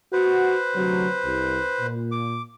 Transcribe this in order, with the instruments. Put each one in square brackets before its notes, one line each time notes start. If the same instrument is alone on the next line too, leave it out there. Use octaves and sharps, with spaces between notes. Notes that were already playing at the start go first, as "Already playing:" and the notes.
[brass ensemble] F#4 [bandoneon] B4 C5
[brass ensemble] D2 C3 F#3
C2
A#2
[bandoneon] D6